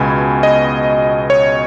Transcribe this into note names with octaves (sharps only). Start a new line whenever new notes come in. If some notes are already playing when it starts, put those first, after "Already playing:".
Already playing: C#2 B2 G#5 B5
D#5
C#5